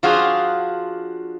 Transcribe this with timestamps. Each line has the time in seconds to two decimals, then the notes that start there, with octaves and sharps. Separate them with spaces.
0.03 F3 D4 F4 F#4 G#4 C5